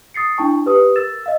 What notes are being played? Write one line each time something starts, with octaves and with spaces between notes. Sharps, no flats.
D#6 A6 C7 C#7
D4 E4 G5 A5 C#6
G4 B4 D#6
A#4 E6 A6 E7
D#5 F5 E6